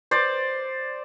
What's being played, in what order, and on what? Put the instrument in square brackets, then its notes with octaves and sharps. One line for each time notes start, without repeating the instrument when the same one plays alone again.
[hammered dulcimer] C5 D5